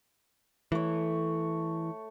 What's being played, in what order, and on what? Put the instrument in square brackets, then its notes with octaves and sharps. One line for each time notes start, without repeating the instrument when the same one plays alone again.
[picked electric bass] E3 [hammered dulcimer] A3 C#5